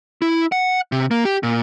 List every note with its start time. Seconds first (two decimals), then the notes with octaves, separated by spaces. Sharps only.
0.22 E4
0.52 F#5
0.92 C3
1.11 A#3
1.25 G4
1.43 A#2